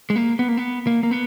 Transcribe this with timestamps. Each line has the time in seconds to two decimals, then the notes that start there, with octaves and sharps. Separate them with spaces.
0.10 G#3
0.16 A#3
0.39 B3
0.48 A#3
0.57 B3
0.87 A#3
1.03 A#3
1.11 B3